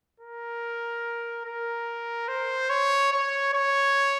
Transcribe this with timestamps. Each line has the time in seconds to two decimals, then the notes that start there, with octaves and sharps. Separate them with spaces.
0.20 A#4
1.45 A#4
2.28 C5
2.70 C#5
3.12 C#5
3.53 C#5